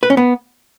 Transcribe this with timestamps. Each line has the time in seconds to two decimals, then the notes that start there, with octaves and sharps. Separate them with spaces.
0.03 B4
0.10 C#4
0.17 B3